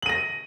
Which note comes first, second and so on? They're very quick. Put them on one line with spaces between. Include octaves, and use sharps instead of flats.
F#7 D#7 A#6